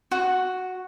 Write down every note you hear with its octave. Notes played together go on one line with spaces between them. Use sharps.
F#4